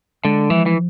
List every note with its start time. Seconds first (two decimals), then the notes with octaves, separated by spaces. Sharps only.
0.25 D3 G#3
0.50 E3 F3
0.66 E3